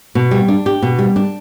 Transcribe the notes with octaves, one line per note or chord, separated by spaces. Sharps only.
B2
G3
D4
G4
B2
G3
D4